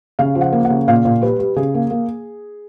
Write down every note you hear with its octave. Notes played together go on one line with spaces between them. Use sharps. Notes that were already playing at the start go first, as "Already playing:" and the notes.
C#3 F5
F3
F#5
A#3
F#5
C#3
A#2 F5
A#2
G3 B4
G3
C#3 G#4
A#3
A#3